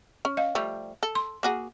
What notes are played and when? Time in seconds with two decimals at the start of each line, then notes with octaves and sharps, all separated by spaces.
0.25 C#4
0.37 D#5 F5
0.55 F3 G3 A3
1.03 A4
1.15 C6
1.43 A#3 F#4 G#4